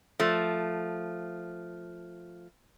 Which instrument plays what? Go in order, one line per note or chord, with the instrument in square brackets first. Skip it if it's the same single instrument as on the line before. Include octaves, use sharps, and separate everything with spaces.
[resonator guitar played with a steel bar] F3 A3